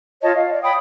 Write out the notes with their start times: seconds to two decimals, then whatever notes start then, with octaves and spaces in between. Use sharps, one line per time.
0.23 F4 C#5 D#5 A5
0.37 F5
0.51 D5
0.63 C#5 G5 B5 D#6